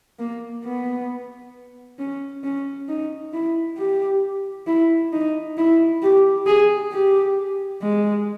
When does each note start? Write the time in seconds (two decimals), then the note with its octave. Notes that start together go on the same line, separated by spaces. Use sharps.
0.19 A#3
0.64 B3
1.99 C#4
2.44 C#4
2.89 D#4
3.33 E4
3.77 G4
4.67 E4
5.13 D#4
5.58 E4
6.03 G4
6.47 G#4
6.92 G4
7.82 G#3